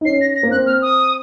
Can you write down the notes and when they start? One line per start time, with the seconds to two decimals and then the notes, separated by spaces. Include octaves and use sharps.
0.01 D#4
0.05 C#4 C7
0.21 A#6
0.36 A#6
0.43 A#3
0.51 C4 F#6
0.66 F6
0.82 D#6